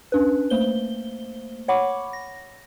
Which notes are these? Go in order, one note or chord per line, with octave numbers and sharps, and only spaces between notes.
C#4 D4 B4
A3 A#3 C5 G7
C#5 F#5 B5 C#6 D6
A#6